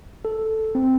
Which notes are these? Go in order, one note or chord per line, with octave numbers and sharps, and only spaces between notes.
A4
C4